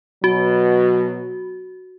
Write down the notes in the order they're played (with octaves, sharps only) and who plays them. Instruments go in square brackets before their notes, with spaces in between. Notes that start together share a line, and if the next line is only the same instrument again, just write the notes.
[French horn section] B2 F#3 [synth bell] F#4